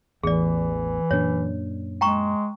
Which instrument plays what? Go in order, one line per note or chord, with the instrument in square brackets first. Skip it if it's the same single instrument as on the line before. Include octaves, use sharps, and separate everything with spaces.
[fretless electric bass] A1 E2 [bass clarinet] E3 [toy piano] G#4 D5
[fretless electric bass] F#2 A#2 D4 [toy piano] C#5
[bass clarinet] G#3 [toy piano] G5 A#5 C#6